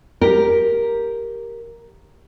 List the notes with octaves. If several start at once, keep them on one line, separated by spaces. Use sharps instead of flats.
G4 A#4